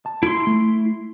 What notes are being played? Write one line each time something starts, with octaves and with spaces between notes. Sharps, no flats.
A5
E4 C6
A3